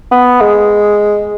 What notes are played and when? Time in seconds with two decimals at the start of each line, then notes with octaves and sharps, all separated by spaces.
0.12 B3
0.41 G#3